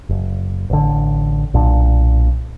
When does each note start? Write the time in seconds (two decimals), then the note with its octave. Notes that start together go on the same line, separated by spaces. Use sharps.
0.09 F#1
0.70 A1 D3
1.54 B1 A#2 D4